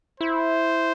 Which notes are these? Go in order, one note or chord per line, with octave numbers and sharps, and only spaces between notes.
E4 C5